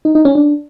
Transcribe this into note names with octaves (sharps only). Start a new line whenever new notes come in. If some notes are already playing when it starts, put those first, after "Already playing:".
D#4
D#4
C#4
D4